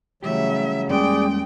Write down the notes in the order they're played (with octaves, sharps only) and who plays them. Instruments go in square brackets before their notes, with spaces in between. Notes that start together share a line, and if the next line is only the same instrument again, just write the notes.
[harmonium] C#3 F#3 [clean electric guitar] E3 G3 G4 [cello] A3 E5
[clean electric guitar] E2 G3 A#3 [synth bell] G#3 C#4 [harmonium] G#4 D5 [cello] G5